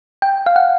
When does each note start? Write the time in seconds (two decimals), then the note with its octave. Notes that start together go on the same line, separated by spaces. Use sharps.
0.22 G5
0.46 F5
0.56 F#5